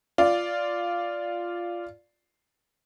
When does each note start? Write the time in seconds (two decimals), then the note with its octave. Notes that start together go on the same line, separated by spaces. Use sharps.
0.18 F4 D5